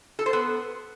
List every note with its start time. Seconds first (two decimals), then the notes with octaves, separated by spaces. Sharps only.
0.19 A4
0.26 C5
0.33 B3